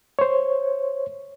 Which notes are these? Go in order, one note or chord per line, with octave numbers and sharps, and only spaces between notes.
C5 C#5